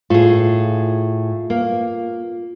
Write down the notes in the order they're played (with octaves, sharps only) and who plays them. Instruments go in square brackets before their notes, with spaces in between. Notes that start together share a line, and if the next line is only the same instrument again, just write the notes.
[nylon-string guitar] A2 G#4 [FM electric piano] F4
[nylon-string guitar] A#3